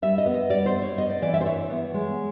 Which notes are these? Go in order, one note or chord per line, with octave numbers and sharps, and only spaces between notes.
G3 E5
D#5
B3
D#5
G3 D5
C5
G3
C#5
B3 D#5
D5
E3 D5
E5
C5
E3 C#5
B3
G#3